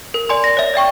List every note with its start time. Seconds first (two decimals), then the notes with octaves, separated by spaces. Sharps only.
0.14 A#4
0.29 D5 G#5 C6
0.44 A#6
0.57 C#5 E5
0.74 D5 E5 G5 C#6